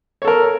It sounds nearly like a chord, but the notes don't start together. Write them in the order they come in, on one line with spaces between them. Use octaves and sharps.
C#5 A4 A#4